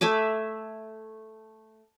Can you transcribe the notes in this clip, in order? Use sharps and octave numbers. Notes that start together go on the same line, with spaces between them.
A3 E5 G#5 D6